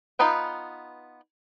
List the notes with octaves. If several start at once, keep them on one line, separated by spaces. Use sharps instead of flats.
B3 D#4 F4 B4 G5